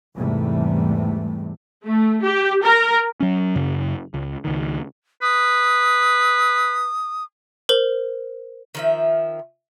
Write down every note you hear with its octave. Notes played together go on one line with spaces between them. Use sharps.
E2 G#2 C3 E3 G3 A3
A3
G4
A#4
F#3 C#4
F#2 C#3
C#2
C#2 D#3
B4 D#6
A#4 C5 F#7
D#3 F3 E5